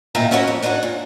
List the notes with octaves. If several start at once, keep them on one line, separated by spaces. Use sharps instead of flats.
A#2 D#3 E4 F4 E5 A#5
C#4 E4 F#4 A#4 C#5 D#5
F2
D4 D#4 F#4 B4 C#5
A#2